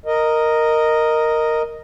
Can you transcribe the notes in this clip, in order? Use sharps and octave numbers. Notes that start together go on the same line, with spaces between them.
A#4 D#5